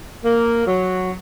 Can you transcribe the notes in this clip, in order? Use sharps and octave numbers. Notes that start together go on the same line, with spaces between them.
A#3
F#3